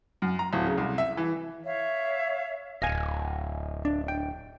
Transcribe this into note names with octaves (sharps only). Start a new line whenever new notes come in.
F#2
A#5
D1
C#3
C2
E5
E3
C#5 E5 F5
D1 D#5 F5 G#5
D4
G5